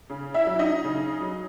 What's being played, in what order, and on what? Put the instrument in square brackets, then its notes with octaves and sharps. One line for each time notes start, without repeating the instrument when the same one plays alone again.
[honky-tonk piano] C#3
E4 E5
F#3
D#4 D#5
C#3
F#3